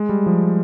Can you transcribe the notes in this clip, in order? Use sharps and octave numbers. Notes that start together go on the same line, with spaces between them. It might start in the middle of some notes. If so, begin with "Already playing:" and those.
Already playing: G#3
G3
F3